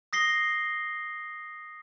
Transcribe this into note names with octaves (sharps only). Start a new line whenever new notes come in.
D#6 A#6 C7 G7